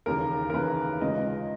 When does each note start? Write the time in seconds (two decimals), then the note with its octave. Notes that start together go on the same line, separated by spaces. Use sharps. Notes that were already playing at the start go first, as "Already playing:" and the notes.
0.06 D#2 C#3 E3 A#4
0.50 A#4
0.53 D#2 C#3 E3 B4
1.01 C#2 C#3 G#3 D#5